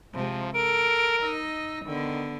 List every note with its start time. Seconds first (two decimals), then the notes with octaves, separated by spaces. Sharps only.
0.14 C3 F3 G#3
0.54 A4 A#4 D7
1.22 D#4 D#5 E6
1.86 D3 D#3 B3